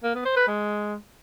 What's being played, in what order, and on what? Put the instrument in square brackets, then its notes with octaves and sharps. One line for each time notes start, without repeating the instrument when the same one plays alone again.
[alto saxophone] A#3
B3
C5
B4
G#3